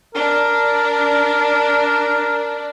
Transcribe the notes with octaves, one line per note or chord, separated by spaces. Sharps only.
D4 A#4